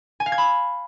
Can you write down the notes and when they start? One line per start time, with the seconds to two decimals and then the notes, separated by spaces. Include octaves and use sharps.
0.20 G#5
0.26 F5
0.32 G#6
0.38 B5